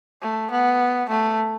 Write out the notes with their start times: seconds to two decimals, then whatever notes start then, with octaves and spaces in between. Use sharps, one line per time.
0.21 A3
0.51 B3
1.09 A3